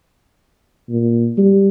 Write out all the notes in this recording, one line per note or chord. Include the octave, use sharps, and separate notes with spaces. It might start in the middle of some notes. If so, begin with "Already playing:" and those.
A#2
G3